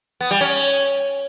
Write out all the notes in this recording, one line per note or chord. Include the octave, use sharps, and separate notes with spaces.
B3
G3
C#4